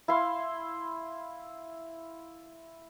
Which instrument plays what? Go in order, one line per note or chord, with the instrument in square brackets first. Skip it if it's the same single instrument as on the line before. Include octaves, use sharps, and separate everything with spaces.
[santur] E4 F5 C6